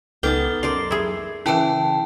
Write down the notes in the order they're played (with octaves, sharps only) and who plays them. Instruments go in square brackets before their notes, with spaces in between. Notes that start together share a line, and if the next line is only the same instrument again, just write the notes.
[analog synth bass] C#2 [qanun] B3 D#4 A5 [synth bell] A4 F6 G7 [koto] G5
[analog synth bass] F#2 [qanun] A#4 C5 D5 [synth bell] C7
[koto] E4 G#4
[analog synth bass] C#3 [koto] E3 B4 [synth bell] E4 G5 A5